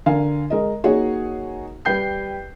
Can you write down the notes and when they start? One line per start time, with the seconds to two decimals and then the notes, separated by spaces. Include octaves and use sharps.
0.06 D3 A#4 F5 G#5
0.50 G#3 A#4 D#5
0.84 A#3 D#4 F#4 G#4 C#5
1.85 G3 B4 G5 G6 C7